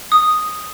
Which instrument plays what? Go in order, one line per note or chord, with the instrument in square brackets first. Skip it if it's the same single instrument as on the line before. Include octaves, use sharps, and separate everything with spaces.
[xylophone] D#6